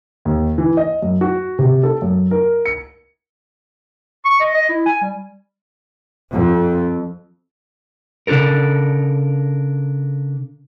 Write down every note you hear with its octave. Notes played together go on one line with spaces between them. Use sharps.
D#2
E3
D#5
F#2
F#4
C3
A4
F#2
A#4
C#7
C#6
D#5
D#5
E4
G#5
G3
F2
C#3 D4 F#4 A4 A#4